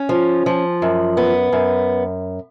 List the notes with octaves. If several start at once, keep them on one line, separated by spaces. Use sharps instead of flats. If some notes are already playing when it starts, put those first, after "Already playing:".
Already playing: C#4
F3
F3
F#2
B3
F#2